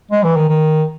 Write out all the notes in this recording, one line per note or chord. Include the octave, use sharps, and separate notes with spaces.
G#3
E3
D#3
D#3